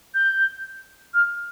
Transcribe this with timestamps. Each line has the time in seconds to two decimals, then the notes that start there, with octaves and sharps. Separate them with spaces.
0.14 G6
1.14 F6